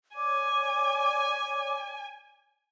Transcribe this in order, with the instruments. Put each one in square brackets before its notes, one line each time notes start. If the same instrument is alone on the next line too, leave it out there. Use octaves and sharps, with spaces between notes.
[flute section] C#5 D5 D6 [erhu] G#5